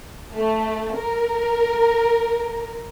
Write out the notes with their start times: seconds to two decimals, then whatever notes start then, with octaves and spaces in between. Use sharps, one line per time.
0.35 A3
0.96 A#4